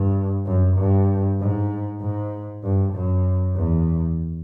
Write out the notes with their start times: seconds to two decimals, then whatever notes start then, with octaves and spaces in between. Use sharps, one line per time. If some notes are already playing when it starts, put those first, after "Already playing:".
Already playing: G2
0.46 F#2
0.78 G2
1.40 G#2
2.01 G#2
2.64 G2
2.94 F#2
3.56 E2